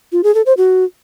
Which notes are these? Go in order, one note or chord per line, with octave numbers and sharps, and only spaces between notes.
F4
G#4
A4
C5
F#4